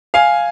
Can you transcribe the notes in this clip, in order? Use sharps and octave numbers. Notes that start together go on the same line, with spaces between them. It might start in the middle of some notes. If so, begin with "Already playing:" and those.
F5 G#5